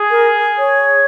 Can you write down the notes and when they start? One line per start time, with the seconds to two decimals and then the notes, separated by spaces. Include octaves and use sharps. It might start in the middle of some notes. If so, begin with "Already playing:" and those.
Already playing: G#4
0.11 A#4
0.58 C#5